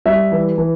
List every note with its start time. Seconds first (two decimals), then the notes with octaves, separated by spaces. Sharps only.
0.06 G3 E5
0.32 E3
0.58 E3